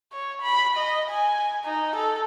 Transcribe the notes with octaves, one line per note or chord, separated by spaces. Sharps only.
C#5
B5
D#5
G#5
D#4
A4